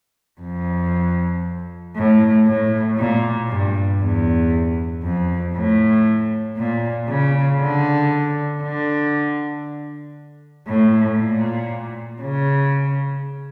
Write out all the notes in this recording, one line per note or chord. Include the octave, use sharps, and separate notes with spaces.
F2
A2
A2
A#2
G2
E2
F2
A2
A#2
C#3
D3
D3
A2
A#2
C#3